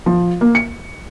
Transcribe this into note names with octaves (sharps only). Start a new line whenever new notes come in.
F3
A#3
C#7